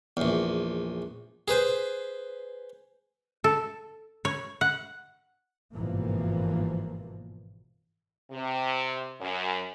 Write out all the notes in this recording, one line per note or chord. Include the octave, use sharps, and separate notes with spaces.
A#1 E2
G#4 B4 C5
A4
C#5
F#5
G#1 G2 B2 E3 F3 A#3
C3
F#2